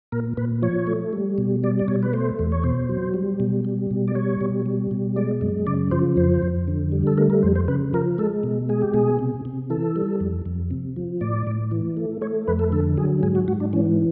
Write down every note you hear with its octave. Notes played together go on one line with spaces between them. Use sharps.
A#2 A#4
A#2 B4
F3 C#5
A3
G3
B2
G3 D5
D5
B2 C#5
B4
A3 C5
E2
C#5
B2 C5
F#3
G3
B2
G3
B2
D5
G3 C#5
B2
G3
B2
G#3 D5
F#2
C#3 D5
F3 C5
F2 C5
F2
D3
G3
A4
A3 A#4
A#4
F2 C5
C5
C#3 B4
F3 A#4
G#3 A4
B2
G#3 G#4
G4
B2 G#4
C3
C3
E3 A4
G3
F2
F2
C3
F3
A2 D5
A2
E3
A3
A3 C#5
F2 B4
A4
D3 A4
F#3 G#4
G#2 G#4
F#4
G#2 F#4
D4
E3 C#4